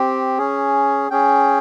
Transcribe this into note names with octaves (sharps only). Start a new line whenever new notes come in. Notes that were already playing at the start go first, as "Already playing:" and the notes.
Already playing: C4 G4
C#4 G#4
C#4 G#4 G5